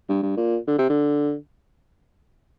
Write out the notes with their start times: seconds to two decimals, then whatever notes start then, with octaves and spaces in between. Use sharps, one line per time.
0.09 G2
0.22 G2
0.37 A#2
0.67 D3
0.78 C3
0.89 D3